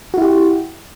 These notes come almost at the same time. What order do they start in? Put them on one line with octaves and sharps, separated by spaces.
F#4 E4 G4